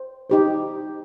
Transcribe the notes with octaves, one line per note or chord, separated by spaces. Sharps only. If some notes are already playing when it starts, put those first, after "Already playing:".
Already playing: C5
D#4 G4 C5